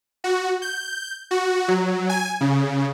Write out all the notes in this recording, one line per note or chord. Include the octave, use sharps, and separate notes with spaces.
F#4
G6
F#4
F#3
G#5
C#3